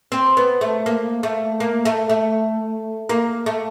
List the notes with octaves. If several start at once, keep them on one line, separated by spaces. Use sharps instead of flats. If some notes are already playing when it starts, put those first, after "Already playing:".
C4
B3
A3
A#3
A3
A#3
A3
A3
A#3
A3